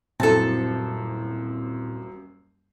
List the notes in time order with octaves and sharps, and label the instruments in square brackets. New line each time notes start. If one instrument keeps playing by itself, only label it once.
[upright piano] D#1 F#2 C5 [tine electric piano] A#2 [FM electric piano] C4 E4 [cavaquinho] A4 A5